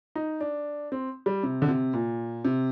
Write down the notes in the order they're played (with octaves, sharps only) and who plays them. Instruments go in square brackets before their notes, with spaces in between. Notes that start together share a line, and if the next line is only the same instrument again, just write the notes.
[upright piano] D#4
D4
C4
G3
C3
D3
C3
A#2
C3